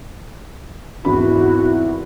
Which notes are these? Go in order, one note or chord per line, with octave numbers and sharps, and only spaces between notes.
G#1 E2 E4 F#4 B5